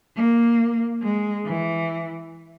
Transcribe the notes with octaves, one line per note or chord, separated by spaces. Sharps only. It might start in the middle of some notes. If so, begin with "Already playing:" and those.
A#3
G#3
E3